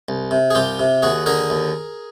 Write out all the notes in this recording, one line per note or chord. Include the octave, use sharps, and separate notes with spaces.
C2
C3
G#4
C2 F4 G4
C3
D#2 F#4 G#4
D3 G#4 A#4
D#2